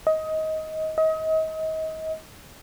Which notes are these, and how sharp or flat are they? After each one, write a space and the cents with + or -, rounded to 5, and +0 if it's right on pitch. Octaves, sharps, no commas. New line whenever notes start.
D#5 +20
D#5 +35